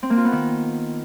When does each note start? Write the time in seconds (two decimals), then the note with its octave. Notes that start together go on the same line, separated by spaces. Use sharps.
0.03 C4
0.10 A#3
0.17 F4
0.25 B3
0.32 D#3